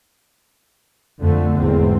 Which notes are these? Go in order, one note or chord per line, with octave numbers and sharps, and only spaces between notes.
F2 D3 A3
G#1 E2 C4